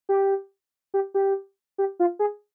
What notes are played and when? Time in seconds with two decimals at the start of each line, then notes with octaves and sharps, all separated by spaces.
0.09 G4
0.94 G4
1.14 G4
1.78 G4
2.00 F4
2.19 G#4